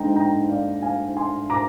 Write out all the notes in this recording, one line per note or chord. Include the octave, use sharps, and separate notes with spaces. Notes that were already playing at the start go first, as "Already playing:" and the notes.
Already playing: D3 G#3 D#4 G5 A#5
G5 A#5
D5 F5
F5 G#5
G#5 C6
A#5 D6